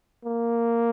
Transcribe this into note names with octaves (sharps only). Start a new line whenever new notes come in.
A#3